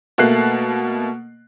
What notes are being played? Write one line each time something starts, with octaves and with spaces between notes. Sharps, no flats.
B2 A3 A#3 F#6 C7